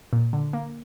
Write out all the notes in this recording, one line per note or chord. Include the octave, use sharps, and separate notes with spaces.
A#2
D3
A#3